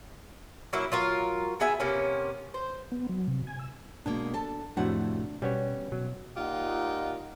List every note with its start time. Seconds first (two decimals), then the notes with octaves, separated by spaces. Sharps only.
0.73 F#3 A#3 E4
0.92 F#3 F4 A#4
1.60 B3 G#4 E5 G#5
1.80 C3 A#3 B3 C#4
2.54 C5
2.92 B3
3.09 F#3
3.28 C3
3.47 G#5
3.59 E6
4.06 B2 G#3 A#3 D4
4.34 A4 A5
4.77 F2 A2 C3 A3 D4 F#4 F#5
5.42 B2 G3 B3 C#4 C#5
5.92 B2 F#3
6.36 A#2 D#4 F4 G4 D#5 F#5